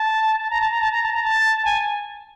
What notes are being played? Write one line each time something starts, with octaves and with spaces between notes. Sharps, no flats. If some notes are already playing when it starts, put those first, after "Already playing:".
Already playing: A5
A5
A#5
A5
A#5
A5
A#5
A5
A#5
A5
G#5